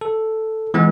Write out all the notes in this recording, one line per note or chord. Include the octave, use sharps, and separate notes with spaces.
A4
E3 G#3 B3